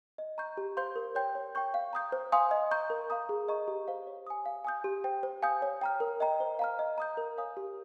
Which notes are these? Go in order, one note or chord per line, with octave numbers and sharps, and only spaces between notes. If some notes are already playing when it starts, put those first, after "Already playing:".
D#5
A#5 C#6 G6
G4
C5 F5 C6 G6
A#4
C#5 G5 C6 G6
C#5
G5 C#6 G6
F5
A#5 D#6 G6
C5
F5 G#5 C6 D#6
D#5
A#5 C#6 G6
A#4
F5 A#5 D#6
G#4
D#5 A#5 C#6
G4
C5 F5
C#5
G#5 D#6
F5
G#5 D#6 G6
G4
C5 G5
C5
F5 G#5 D#6 G6
C#5
G5 A#5 F6
A#4
D#5 G5 A#5
C5
F5 A#5 F6
D#5
A#5 D#6 G6
A#4
C#5 F5 G#5 D#6
G4